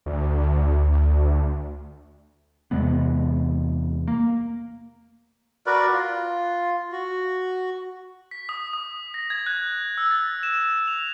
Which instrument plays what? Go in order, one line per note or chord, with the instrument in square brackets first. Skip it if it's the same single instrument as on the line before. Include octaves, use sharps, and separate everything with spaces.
[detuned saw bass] D2
[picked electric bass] E2 C3 G#3 B3
A#3
[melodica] F#4 A#4 B4 D5
F4
F#4
[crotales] B6
D#6
D#6
A#6
G#6
F#6
E6
A6
E7
F7